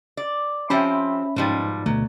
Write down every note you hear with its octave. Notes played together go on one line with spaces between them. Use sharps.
D5
F3 C4 C#4 G4 E5 B5
G#2 B2 F3 G3 D#4
D2 B2 F#3 A3